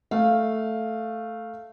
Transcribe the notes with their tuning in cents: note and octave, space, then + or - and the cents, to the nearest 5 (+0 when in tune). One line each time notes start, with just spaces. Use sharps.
A3 +0 F5 +0